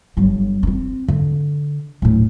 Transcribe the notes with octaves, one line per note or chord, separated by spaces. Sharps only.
G1 F#3
C4 C#4
D3
D1 A2